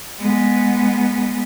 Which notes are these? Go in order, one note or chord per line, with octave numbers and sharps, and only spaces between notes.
G#3 B3